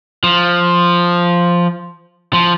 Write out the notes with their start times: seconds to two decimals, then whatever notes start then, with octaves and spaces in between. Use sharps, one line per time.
0.23 F3
2.33 F3